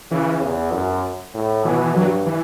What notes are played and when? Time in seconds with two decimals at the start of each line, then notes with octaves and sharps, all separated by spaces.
0.11 C#3 E3
0.42 E2
0.73 F#2
1.34 A2
1.65 B2 E3
1.81 E3
1.96 G2 F#3
2.26 E3